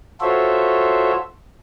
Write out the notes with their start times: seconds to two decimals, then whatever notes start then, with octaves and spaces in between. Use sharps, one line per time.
0.21 F4 F#4 A4 C5 C#5 E5